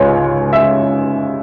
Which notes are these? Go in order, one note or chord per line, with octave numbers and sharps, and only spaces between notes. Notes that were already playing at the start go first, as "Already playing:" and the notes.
Already playing: C#2 C#3 G#3 C#5
E5